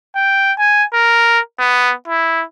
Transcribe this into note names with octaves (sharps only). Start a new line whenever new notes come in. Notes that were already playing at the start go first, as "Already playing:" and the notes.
G5
G#5
A#4
B3
E4